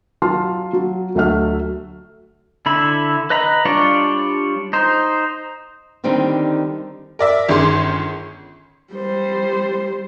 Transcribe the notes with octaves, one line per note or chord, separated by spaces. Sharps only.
F#3 F4 A5 C6 F6
F#3
D2 F#3 A3 A4 E5 F6
D3 E4 B5
B4 D#5 A#5 B5
G3 D4 F4 C#5 D5
D#4 C5
D3 D#3 G3 C4 D4 D#4
A#4 D5 E5
G1 D#3 C#4 G#4 C6
G3 C5